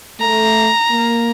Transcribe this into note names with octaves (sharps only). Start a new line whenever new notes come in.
A3 A#5
A#3